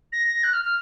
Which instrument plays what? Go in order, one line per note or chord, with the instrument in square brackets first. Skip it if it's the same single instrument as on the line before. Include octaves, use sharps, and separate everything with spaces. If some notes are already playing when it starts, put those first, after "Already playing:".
[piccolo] A#6
A#6
F#6
F6
F6